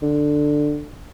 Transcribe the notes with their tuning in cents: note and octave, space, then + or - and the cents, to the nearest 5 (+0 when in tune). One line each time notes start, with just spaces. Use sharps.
D3 +10